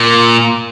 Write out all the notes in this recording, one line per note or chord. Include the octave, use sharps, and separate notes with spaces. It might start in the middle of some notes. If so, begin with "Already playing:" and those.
Already playing: A#2